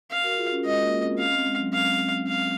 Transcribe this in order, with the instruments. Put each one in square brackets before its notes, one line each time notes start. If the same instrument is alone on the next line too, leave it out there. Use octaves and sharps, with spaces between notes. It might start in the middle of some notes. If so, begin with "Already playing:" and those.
[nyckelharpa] F5
[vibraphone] F#4 A#4
F4 G#4
C#4
[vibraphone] G#3 [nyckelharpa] D#5
[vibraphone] A#3
C4
[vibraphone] C#4 [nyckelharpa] F5
[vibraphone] C4
G#3
F#3
[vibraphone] C4 [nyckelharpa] F5
[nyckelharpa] F5